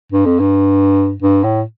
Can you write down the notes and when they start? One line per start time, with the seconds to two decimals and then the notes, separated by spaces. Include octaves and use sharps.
0.12 G2
0.26 F2
0.39 G2
1.22 G2
1.43 A2